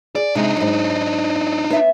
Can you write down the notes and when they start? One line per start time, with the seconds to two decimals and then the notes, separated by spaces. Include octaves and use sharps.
0.16 G#4 D5
0.35 C3 G#3 D4 D#4
0.57 G#2 F#3
1.70 B3 C#5 E5